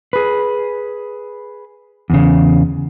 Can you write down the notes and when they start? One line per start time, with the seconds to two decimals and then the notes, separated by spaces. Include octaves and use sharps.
0.13 G#4 B4
2.10 E2 C#3